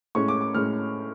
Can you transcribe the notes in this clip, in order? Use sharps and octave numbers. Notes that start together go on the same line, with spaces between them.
A2 G#3 C#4 C#6
D6
D6
A2 G#3 C#4 F6